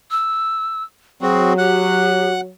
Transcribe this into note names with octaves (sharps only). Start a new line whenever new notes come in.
E6
F#3 C4 F#4 G#4
G4 F#5 F#6